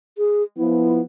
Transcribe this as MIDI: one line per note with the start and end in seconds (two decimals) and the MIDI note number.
0.18 0.43 68
0.57 1.01 53
0.57 1.01 59
0.57 1.01 64